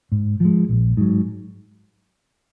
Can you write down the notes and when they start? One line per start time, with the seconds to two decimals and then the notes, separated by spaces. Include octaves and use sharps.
0.12 G#2
0.40 F3 G#3
0.69 A#1
0.97 G#2 F#3